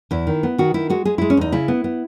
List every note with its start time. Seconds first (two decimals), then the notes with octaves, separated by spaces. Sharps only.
0.11 E2 E4
0.27 D#3
0.43 B3
0.58 D#3 F#4
0.74 D#3 E4
0.90 G#3 F#4
1.05 G#3 G#4
1.18 G#3 E4
1.30 C#4
1.37 E2 D#4
1.52 C#3 E4
1.68 B3
1.84 B3